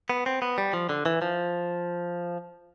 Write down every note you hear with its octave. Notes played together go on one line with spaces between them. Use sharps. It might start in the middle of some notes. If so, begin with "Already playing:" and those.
B3
C4
B3
G3
F3
D3
E3
F3